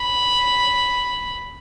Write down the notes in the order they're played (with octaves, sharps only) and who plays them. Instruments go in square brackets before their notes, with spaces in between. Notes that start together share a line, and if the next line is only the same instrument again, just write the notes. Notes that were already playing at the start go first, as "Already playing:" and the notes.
Already playing: [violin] B5